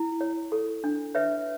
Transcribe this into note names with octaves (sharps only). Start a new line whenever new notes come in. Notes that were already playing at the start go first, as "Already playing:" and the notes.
Already playing: E4
C#5
A4
D4
B4 C#5 E5